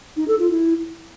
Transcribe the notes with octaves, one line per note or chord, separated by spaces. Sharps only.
D#4
A4
F4
E4